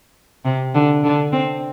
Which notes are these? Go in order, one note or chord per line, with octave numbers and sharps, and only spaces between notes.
C3
D3
D3
C4